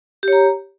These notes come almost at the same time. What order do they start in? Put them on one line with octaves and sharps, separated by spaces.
G4 C#5 A#5